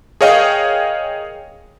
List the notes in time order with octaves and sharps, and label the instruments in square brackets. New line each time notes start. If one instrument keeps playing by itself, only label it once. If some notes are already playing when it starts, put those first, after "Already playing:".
[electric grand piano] G#4 A#4 C#5 D#5 F5 G5